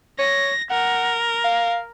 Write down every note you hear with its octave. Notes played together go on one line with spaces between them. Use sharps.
C#5 A#6
A#4 F#5
F5